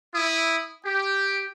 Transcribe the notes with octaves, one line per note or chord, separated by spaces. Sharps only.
E4 D#6
G4